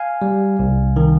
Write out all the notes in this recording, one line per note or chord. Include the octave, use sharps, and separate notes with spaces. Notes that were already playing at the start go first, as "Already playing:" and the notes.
Already playing: F5 G#5
G3
C2
D#3